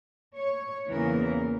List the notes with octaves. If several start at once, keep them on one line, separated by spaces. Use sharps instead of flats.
C#5
E2 C#3 E3 A#3 A#4